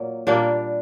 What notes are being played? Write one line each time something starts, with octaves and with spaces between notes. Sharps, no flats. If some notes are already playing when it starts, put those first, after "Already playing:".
Already playing: A#2 F#3 A#3
A#2 G3 A#3 D4